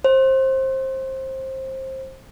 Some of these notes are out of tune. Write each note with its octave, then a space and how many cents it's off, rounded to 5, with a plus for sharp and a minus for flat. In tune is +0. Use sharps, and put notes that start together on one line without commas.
C5 +20